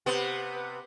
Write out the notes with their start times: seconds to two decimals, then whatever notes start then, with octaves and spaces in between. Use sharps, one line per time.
0.06 C3 B3